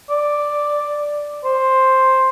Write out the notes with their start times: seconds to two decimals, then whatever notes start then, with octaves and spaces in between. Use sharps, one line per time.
0.10 D5
1.44 C5